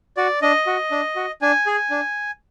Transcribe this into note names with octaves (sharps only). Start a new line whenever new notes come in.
F#4 D5
D4 D#5
F#4
D4
F#4
D4 G#5
G#4
D4